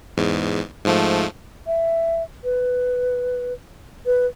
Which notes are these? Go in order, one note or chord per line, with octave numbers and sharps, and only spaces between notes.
E2 G#2
G#2 F3 A3
E5
B4
B4